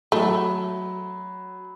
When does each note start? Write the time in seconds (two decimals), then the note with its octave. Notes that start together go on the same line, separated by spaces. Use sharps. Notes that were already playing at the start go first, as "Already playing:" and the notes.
0.12 F#3 A3 B5